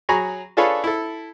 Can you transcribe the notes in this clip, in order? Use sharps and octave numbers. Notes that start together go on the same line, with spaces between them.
F#3 G#4 G#5 A#5 B5 C#6
D4 F4 G#4 A4 B4 C#5
E4 A4